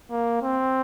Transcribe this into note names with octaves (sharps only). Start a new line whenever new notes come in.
A#3
C4